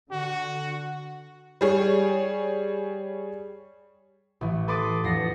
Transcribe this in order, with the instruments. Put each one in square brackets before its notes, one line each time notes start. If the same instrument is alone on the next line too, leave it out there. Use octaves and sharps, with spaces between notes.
[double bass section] D3 [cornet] F#4
[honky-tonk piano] G3 G#4 C#5
[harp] A1 E3
A4 B4 C6 D6 D#6 A6
E2 F3 D4 A#6 C7 C#7